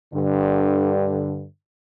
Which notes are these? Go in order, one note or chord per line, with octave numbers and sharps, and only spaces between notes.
G2 D3